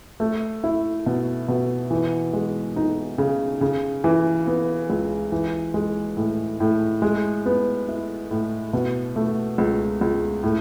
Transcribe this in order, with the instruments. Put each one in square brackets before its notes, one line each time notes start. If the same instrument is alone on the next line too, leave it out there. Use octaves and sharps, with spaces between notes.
[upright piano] A3
E4
B2
B2
E3
G#3
D#4
C#3
C#3
E3
B3
C#2
E3
G#3
A2
A2
G#3
B3
E4
A2
B2
A3
C#2
C#2
A2